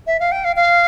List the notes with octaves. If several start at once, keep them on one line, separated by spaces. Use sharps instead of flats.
E5
F5
G5
F5
F5